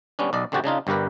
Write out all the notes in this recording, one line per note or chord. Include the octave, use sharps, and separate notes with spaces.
G3 B3 C#4 D4
B1 D5 D#5
A1 D3 C4 F#4 G4 A5
C#3 D4 D#4 F4
G1 G2 G4 A#4 B4